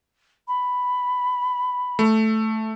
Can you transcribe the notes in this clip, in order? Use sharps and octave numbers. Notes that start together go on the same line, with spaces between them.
B5
A3